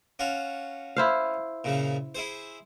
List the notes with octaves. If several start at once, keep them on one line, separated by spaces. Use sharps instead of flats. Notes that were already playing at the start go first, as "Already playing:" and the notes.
C#4 F4 F#4
E4 C5 F5
A#2 C#3 F3
E4 G#4 C5